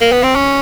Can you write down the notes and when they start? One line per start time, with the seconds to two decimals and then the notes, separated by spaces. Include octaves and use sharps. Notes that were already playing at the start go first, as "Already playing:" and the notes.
0.01 A#3
0.12 B3
0.23 C4
0.35 C#4